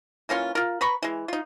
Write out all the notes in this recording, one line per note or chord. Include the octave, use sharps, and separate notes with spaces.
E3 A#3 C#4 F4
F4 A#4
B4 A#5 B5 C#6
E3 G#3
D#4 F4